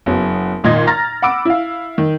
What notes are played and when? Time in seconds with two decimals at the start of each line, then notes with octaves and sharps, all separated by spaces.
0.06 F#1 F#3 B3
0.64 G#1 A#2 D#3 D#5 G#6
0.87 A#5 F6 A6 A#6
1.22 F#5 B5 D6 E6 D7
1.45 E4 F5
1.98 D#3